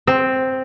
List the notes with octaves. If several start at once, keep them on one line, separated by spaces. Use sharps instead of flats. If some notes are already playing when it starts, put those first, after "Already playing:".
C4